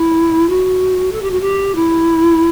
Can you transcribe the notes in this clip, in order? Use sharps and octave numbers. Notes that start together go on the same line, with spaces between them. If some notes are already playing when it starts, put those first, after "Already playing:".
Already playing: E4
F#4
A4
G4
F#4
G4
E4